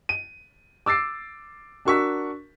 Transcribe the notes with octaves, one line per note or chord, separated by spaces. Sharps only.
D#7
D6 E6 A6 C7 D7
D4 F#4 A#4 C#6 E6 B6